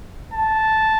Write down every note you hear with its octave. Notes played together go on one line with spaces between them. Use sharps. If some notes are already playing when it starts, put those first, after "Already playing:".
A5